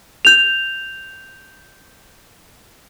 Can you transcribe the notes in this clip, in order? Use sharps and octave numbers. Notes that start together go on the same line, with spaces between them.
G6 F7